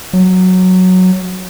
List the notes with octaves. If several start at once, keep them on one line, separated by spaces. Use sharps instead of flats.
F#3